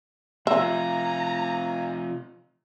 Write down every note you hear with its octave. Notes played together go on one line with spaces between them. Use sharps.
C3 F3 E5 F5 G#5 A#5